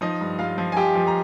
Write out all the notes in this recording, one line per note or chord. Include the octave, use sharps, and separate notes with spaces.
F3 D#4 D#5
G2
G2 F4 F5
F3
G#5
F3 G4 G5
F3
A#5